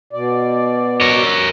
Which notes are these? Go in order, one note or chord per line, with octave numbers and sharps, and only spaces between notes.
B2 D5
A#4 C#5